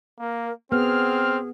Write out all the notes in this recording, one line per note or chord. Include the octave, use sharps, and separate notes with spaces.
A#3 A#4
B3 C4 G#4 F6